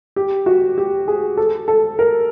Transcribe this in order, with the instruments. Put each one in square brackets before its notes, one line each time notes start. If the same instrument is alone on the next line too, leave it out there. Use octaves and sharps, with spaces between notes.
[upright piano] G4
F#4
G4
G#4
A4
A4
A#4